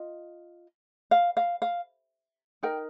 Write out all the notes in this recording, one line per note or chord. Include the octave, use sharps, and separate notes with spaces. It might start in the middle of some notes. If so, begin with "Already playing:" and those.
Already playing: F4 D#5
F5
F5
F5
D#4 A#4 G5